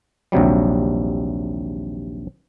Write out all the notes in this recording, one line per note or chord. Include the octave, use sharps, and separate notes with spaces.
A#1 D#2 C3 F#3 G3